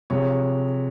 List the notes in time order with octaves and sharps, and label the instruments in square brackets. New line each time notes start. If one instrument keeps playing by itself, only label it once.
[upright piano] C3 F3 G#3 C#5